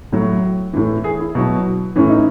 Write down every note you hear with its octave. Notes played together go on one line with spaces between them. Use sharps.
A2 F#3
A2 E3
G#4
E4
B2 F#3
A2 E3 C#4
D#4